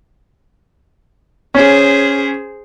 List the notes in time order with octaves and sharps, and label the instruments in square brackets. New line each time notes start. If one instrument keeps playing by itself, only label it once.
[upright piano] C#4 [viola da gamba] G#4 C5